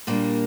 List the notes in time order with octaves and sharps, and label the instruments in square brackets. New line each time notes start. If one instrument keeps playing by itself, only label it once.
[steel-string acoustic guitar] A#2 G3 A#3 D4